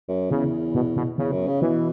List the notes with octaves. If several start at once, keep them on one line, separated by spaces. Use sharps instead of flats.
F#2
E2 C#3
B2
B2
E2 C#3
F#2
C#3
B2 E3